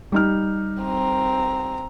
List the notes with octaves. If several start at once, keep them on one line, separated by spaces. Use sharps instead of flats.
G3 D#4 F6
C4 A#5